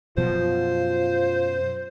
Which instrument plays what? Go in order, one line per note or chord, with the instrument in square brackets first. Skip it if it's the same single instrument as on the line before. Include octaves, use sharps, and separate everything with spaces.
[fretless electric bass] F#2 B2 F3 [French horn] F4 [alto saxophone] C5